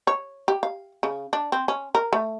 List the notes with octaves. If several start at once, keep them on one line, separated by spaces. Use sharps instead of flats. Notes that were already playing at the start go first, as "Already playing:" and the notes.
C#5
G4
F5
C#3
D4
C4
C#4
A#4
A3